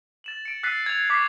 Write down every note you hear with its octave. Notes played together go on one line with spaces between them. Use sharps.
A6 E7 F#7
C#7 D7
E6 F#6 A6 B6 C7 D#7
G#6 F7
C#6 D6 B6 C7